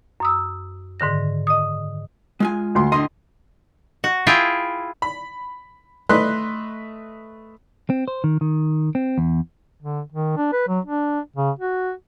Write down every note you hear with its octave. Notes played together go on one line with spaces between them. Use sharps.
F#2 D#6 E6
G#2 D3 D#3 A#6
D#5 D#6
G#3 F4 G#5
D2 C6
A2 D3 D#5 C6
F#4
E4 F4 G#4 G5
B5
A3 B4 D#5 C6 F#6
C4
C5
D#3
D#3
C4
E2
D3
D#3
D4
B4
F#3
D4
C#3
F#4